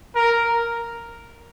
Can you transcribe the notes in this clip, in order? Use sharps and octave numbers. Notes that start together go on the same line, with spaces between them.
A#4